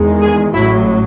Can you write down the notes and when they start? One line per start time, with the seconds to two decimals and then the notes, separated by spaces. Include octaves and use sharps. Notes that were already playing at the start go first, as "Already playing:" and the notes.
Already playing: E2 D#3 G#3
0.22 G#4
0.54 A1 A2 F#3 E4